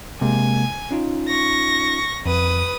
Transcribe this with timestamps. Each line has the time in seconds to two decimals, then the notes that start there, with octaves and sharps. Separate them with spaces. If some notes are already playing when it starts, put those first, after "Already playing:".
0.21 C3 G#3 A#3 G#5
0.91 C#4 D#4 F4
1.29 C#6 A#6
2.26 F2 B4 D#6